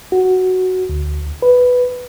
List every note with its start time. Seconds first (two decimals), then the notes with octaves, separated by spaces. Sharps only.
0.12 F#4
0.89 D2
1.42 B4